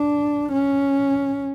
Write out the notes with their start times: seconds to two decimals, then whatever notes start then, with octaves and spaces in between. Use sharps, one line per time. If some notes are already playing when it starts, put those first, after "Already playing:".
Already playing: D4
0.53 C#4